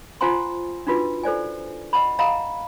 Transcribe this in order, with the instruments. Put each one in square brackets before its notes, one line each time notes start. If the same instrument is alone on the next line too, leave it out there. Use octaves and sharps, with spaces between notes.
[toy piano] F4 C5 F#5 G#5 A#5 C6
D4 D#4 F4 F#4 B4
A4 C5 D5 G#5
D#5 F#5 A5 B5
D#5 F5 F#5 A#5 B5